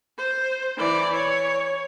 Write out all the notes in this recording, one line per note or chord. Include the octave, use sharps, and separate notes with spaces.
C5
E3 D5
C#5